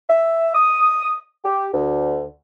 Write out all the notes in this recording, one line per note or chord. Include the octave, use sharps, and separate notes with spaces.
E5
D#6
G4
D2